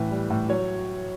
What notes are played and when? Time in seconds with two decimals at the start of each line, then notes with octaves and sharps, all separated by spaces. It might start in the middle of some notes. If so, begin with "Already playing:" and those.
Already playing: A2 E3 B4
0.11 G3
0.30 A2
0.49 F#3 C#5